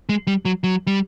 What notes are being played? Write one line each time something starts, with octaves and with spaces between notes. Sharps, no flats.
G#3
G3
F#3
F#3
G3